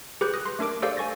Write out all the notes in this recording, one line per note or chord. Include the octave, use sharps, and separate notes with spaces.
G4 G#4 B4 B5 G6
D#6 F6 F#6 A#6
C6
A3 D4 A#4 D6 D7
G4 A4 C5 D5 F5
G#5 C#6 A6 A#6